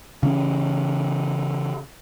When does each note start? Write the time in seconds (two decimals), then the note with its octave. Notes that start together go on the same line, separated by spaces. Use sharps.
0.23 C#3 E3 C#4